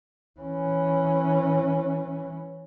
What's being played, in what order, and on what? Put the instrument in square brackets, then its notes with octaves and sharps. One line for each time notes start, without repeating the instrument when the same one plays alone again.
[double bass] E3 C#4